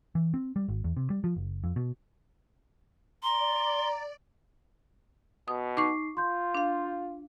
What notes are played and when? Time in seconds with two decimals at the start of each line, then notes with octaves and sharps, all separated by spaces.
0.15 E3
0.34 C4
0.56 G3
0.69 G#1
0.84 E2
0.97 C3
1.10 G3
1.24 F3
1.36 F#1
1.64 F2
1.76 B2
3.23 D5 A#5 C6
5.48 B2 D#6
5.77 D#4 C#6 D6 C7
6.17 F4 C6 G6
6.55 D4 F5